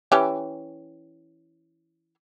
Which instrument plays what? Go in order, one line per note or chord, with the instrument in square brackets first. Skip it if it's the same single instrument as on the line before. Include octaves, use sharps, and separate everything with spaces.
[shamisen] E3 C#4 G4